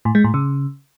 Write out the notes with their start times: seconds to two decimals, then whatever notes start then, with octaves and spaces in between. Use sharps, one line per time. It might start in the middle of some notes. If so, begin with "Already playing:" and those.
0.05 A2
0.15 G#3
0.24 A2
0.34 C#3